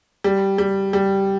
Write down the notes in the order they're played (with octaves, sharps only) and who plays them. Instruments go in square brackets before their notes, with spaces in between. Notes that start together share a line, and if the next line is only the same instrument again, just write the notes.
[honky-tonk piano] G3
G3
G3